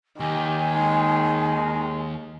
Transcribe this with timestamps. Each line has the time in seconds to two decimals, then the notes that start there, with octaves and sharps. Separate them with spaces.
0.20 D#2 D#3 G4 G#5
0.75 G#3 D#4